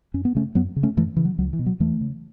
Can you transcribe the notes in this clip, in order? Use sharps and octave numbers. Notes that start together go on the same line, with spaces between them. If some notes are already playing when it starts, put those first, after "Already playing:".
F#2 C#4
B3
C#3 A3 C#4
F#2 F#3 B3
C#3
A3 C#4
F#2 E3 A3
C#3 E3
F#3
C#2 F#3
E3
B2
F#3
E2 E3 A3
C#3